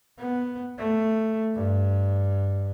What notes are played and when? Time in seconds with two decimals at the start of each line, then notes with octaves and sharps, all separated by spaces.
0.19 B3
0.79 A3
1.55 G2